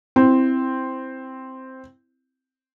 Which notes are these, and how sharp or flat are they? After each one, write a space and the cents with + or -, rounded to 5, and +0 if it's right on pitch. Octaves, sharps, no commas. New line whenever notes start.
C4 +0 E4 +0